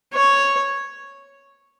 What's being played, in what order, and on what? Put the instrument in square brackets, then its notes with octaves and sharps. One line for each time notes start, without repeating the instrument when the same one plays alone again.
[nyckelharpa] C#5